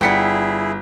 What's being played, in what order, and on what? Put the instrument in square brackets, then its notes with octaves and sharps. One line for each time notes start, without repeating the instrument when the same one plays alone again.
[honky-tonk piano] G1 B6 [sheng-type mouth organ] E4 G#4 [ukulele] D5 F#5 G5